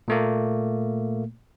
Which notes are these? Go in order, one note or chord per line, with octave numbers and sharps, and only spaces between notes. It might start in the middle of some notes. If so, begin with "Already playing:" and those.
A#2 A3 A#3